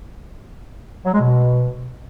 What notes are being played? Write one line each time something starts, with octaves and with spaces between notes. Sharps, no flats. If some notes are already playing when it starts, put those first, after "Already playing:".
F#3
G#3
B2